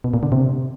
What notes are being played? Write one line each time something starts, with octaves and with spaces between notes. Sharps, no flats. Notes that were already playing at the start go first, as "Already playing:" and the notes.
B2
A#2
D3
C3